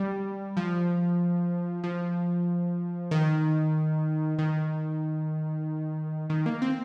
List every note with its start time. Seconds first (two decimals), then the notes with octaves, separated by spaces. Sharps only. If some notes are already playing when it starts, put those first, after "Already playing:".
Already playing: G3
0.57 F3
1.84 F3
3.11 D#3
4.39 D#3
6.30 D#3
6.46 A#3
6.62 C4